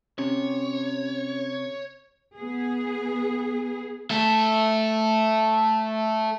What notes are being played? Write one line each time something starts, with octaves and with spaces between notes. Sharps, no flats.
C3 C#4 C#5
B3 G#4
A3 A4